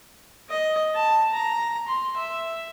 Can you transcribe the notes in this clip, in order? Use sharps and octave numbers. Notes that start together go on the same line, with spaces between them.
D#5
A5
A#5
C6
E5